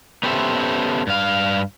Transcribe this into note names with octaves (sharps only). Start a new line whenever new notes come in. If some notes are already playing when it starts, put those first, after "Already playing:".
B3 C#4 G4 A4 C5 E5
G2 F5